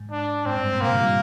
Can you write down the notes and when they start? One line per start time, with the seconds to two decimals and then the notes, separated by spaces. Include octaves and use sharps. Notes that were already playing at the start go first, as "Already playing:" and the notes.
Already playing: G#2
0.11 D4
0.46 G#2 C4
0.55 G2
0.63 G#2
0.72 A#2
0.81 C3 A#3
0.90 D3
0.95 G3
1.00 F3